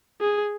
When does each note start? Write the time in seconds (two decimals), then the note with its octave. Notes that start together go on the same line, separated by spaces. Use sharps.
0.21 G#4